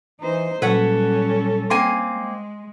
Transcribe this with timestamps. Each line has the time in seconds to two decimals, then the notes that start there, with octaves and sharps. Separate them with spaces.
0.20 E3 D#4 C5
0.62 A#2 F#3 G3 C#4 A4 B4 C#5 F#5
1.70 A#3 C4 G#5 C6
2.12 G#3